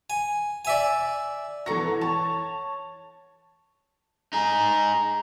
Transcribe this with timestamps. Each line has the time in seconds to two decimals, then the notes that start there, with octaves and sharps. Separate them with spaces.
0.10 G#5
0.65 D5 E5 G#5
1.66 E3 F#4 A4 A#5 A#6
2.01 C#5 A5
4.33 D#4 G#4 A#5